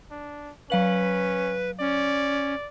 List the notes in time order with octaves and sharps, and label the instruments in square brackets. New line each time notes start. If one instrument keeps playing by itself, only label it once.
[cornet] D4
[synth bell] F#3 F5 F#7 [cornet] C#4 [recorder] B4
[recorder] C#4 [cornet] D5